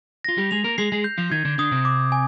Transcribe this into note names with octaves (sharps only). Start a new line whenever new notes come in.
F4 A#6
G3 G4
G#3 G#4 F7
A#3 A#4
G#3 G#4 C7
G#3 G#4
G6
F3 F4
D#3 D#4 G#6
D3 D4
D3 D4 D#6
C3 C4
D6
G#5